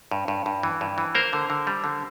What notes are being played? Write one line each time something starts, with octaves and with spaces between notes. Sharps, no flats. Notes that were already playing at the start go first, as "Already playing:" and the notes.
G2
G2
G2
E3
G2
E3
A#3 A#4 C5
D3
D3
G3
D3